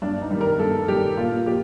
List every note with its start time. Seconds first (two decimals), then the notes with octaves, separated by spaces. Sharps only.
0.02 G2 D4
0.22 D#4
0.31 D#3 G3
0.41 A#4
0.59 G2 A4
0.88 D#3 G3 G4
1.17 A#2 F4
1.46 F3 G4